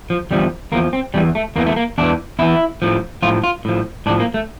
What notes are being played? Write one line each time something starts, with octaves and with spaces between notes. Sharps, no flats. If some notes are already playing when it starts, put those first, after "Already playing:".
F3
E2 D3 F3 G3
E2 D3 F3 A#3
C4
E2 E3 G3
A3
E2 E3 A#3
A3
A#3
E2 E3 D4
E2 E3 E4
A2 F3
A2 F3 F4
F4
A2 F3
A2 F3 D4
A#3
A3